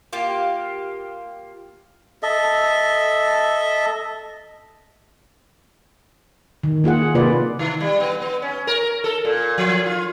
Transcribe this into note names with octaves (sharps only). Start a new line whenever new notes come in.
A#3 F4 G4
A4 D#5 E5
D#3
A#3 F4 G#4 F#5
C3 A#3 F4 B4 D5
D#3
G3
B3
B3
C#4
A#4
A4
A#2
F3
F4